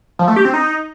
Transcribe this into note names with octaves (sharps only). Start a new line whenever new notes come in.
F3
A3
G4
C4
D#4